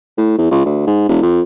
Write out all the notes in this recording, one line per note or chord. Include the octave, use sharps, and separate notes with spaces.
A2
E2
C#2
D2
G#2
E1
F2